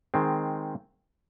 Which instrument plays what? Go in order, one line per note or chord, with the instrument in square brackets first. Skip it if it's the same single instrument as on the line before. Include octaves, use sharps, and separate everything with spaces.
[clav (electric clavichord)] D#3 G#3 C4